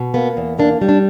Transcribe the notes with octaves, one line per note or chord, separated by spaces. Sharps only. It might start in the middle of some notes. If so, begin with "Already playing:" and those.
Already playing: B2
A#3 B3
E2
A#3 D4
G3
D4